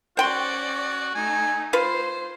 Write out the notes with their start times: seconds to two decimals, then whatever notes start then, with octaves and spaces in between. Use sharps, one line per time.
0.17 C#4 F#4 C5 D5 G5 C6
1.15 A3 D#4 G#5
1.73 F4 B4 C5 C6